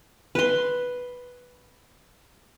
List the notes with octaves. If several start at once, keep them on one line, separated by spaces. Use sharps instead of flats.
B4 C6